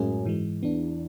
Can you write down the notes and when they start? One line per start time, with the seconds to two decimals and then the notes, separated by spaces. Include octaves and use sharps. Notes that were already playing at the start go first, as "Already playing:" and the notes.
Already playing: F#2 A2 G#3 C#4 G#4
0.25 G#2 E3 G#3
0.62 E2 E3 B3 D4